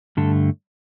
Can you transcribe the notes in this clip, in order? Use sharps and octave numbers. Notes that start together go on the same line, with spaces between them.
G2 D3 A3 A4